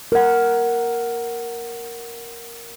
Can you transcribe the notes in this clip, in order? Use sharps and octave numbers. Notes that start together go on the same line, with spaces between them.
A#4 F#5